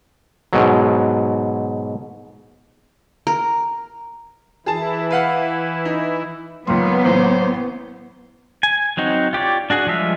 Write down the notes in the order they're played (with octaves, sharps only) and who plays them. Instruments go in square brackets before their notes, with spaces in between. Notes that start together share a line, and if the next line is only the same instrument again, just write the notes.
[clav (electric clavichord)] G#2 B2 F#3
[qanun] A#4
[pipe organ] E3 E4 [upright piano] G#4 A5
[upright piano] B4 F5 F#5
D#4
[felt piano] C#2 D#3 C6 [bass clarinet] F#3 [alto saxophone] A#3 [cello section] B3
[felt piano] A1 [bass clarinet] F#3 [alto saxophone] C5
[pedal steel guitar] G#5
F#3 C4 D#4 F#4
F4 G4 C#5 D5
D4 F#4 G#4
F3 G3 G#3 E5 F5